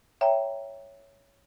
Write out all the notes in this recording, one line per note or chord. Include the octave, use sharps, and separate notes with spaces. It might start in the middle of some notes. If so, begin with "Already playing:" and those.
C#5 E5 G5 A#5